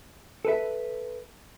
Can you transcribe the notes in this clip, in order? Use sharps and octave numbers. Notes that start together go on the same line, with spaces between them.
A4 B4 E5